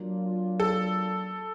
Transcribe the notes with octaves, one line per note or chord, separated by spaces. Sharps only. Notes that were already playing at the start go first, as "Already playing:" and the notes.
Already playing: F#3 A#3 D4 F4
A4